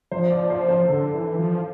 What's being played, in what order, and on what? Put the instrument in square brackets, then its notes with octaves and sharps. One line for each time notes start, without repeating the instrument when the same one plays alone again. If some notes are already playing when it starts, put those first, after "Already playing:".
[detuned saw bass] F3 [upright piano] C5
[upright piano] D5
C5
C5
[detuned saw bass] D3 [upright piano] A4
[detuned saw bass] E3
F3